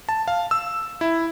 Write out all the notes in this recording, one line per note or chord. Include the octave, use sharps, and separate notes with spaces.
A5
F5
E6
E4